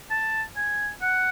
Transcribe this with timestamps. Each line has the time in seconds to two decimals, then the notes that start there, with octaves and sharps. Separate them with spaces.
0.11 A5
0.56 G#5
1.02 F#5